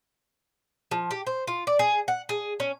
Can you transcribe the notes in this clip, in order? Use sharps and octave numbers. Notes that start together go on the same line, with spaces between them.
F3
G4
C5
F4
D5
G#4
F#5
G#4
C#4